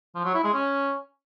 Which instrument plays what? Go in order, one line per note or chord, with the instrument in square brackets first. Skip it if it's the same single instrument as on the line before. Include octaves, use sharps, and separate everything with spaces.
[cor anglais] F3
F#3
E4
G#3
C#4